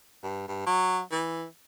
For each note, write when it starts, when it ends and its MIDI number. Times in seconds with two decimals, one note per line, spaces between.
0.24 0.48 43
0.48 0.66 43
0.67 1.00 54
1.12 1.45 52